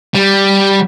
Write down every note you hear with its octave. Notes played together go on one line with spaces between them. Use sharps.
G3